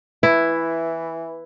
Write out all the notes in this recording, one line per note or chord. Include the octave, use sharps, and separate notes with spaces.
E3 E4 B4